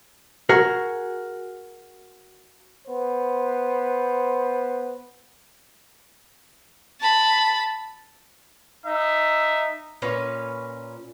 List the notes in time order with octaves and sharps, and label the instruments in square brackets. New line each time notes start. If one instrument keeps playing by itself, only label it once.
[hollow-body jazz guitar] F#4 G#4 A#4
[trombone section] B3 C5
[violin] A5 B5
[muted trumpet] D#4 [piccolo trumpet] E5
[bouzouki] A#2 C#4 B4 C#5